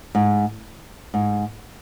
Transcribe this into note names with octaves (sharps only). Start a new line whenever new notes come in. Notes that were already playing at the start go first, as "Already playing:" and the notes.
G#2
G#2